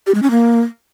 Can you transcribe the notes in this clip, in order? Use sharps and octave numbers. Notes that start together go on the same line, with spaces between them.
G4
G#3
C#4
A#3